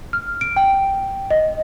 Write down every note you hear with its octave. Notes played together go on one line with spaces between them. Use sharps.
F6
D7
G5
D#5